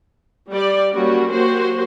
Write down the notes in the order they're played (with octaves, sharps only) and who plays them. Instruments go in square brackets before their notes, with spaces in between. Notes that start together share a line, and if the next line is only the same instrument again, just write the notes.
[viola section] G3 D5
F#3 G3 A#3 C#4 F#4
F#3 A#3 F#4 G4 C5